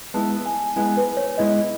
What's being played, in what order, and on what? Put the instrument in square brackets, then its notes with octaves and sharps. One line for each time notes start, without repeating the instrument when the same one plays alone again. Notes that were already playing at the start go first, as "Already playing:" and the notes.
[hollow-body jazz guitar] G#3 B3 E4 [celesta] A5
[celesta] G#5
[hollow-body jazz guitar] G#3 B3 E4 [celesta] G#5
[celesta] B4
C#5
[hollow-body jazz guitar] G#3 B3 E4 [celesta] D#5